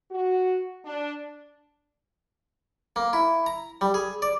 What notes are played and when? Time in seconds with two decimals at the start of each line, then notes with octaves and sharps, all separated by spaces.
0.11 F#4
0.84 D4
2.96 A#3
3.13 E4
3.46 A#5
3.81 G3
3.94 G#4
4.22 D5